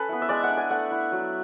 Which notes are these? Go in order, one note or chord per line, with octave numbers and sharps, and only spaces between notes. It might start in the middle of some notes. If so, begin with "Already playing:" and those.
Already playing: C#4 A4 B4
B3 E4
E5
G#3 D5
F#5
D4
G#5
A3 F#5
E4
F#3